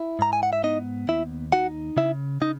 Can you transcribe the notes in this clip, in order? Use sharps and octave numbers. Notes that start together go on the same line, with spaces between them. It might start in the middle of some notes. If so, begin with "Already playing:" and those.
Already playing: E4
G#2 A#5
G#5
F#5
E5
B3 D#4 D#5
D#2 E4 E5
D#4 F#4 F#5
C#3 E4 E5
C#3 D#4 D#5